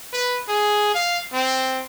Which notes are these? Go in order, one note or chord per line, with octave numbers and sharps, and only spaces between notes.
B4
G#4
F5
C4